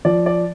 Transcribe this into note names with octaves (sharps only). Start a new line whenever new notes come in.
F3 D5
D5